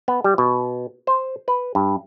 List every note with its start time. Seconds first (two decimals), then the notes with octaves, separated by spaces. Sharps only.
0.08 B3
0.24 G3
0.38 B2
1.07 C5
1.48 B4
1.75 G2